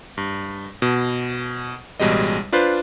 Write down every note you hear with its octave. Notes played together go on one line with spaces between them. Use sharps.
G2
B2
A1 B2 G3 G#3 D#5
D4 F4 B4 C5